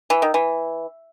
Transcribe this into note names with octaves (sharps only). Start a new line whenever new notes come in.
E3
D#3
E3